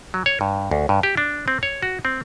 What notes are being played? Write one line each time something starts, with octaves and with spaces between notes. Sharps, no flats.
F#3
C#5
G2
D2
G2
G4
D4
C4
C#5
F#4
C4